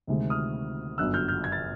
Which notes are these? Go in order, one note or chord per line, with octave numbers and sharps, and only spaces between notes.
D2 C3 D#3 G#3
D#6 F6
G1 F#2 D3 E6 F#6
F6 G6
F6 G6
G#6
A6